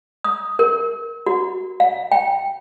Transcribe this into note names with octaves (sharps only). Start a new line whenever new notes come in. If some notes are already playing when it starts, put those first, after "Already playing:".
D#6
A#4
F#4
F5
G5